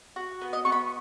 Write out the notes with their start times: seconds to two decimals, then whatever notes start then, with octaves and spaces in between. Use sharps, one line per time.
0.16 F#4
0.41 B3
0.53 D#5
0.65 B3 C#6
0.72 B5